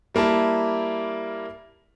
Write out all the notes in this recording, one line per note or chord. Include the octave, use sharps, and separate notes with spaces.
G3 A#3 E4 A5